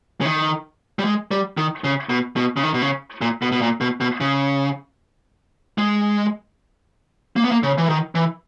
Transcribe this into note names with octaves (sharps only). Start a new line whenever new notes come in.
C#3
D#3
G3
G#3
G3
D#3
C#3
B2
B2
C#3
D#3
B2
C#3
A#2
B2
B2
A#2
B2
B2
C#3
G#3
A#3
B3
A#3
C#3
E3
D#3
E3